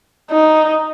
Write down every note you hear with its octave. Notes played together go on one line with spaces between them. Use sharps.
D#4